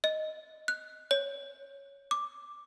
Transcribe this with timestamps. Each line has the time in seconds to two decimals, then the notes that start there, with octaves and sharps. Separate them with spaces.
0.04 D#5
0.68 F#6
1.11 C#5
2.11 D6